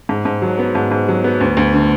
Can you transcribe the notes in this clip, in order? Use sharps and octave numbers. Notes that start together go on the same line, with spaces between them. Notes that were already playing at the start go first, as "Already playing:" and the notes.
G#2
G#2
F#3
B3
G#2
G#2
F#3
B3
D2
D2
D3